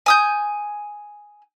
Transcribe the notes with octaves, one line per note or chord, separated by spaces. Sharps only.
G#5 D#6 G6